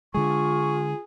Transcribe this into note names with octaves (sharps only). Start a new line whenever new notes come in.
D3 G#3 F4 G#4 C#6